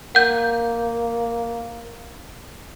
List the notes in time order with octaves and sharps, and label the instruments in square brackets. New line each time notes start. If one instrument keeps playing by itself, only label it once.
[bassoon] A#3 [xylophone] F#5 G6